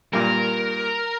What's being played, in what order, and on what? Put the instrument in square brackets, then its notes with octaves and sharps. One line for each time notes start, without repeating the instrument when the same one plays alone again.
[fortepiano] G2 A#2 [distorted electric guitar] A#4